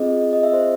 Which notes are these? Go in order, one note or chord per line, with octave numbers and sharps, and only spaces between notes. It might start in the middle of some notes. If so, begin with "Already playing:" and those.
Already playing: C4 F4 G#4 D#5
D#5
E5
C5